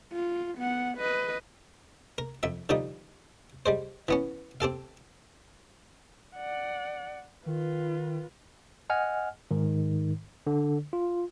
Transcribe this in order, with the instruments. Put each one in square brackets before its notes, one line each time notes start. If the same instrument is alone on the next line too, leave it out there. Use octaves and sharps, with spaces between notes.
[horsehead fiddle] F4
B3 F#5
B4 D#5
[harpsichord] A#4
F2 E5
D3 F3 G3 D#4
G3 G#3 C5
E3 B3 C#4
C4 G4 A4 F5
[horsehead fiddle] D5 F#5
[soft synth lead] D#3 [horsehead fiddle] F4 B4
[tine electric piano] D#5 F#5 G#5 F6
G#2 D#3
D3
F4